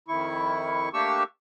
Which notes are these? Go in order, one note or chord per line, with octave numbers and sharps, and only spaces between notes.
F2 D#3 E4 C#6
A3 A#3 D4 G4 C#6 E6